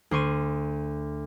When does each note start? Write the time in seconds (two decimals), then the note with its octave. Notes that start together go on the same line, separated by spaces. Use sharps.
0.11 D2 C6 C#6 D#7